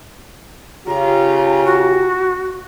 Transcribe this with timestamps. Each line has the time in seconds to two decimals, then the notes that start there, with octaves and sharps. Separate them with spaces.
0.87 C#3 F4 G4 A#5
1.65 F#4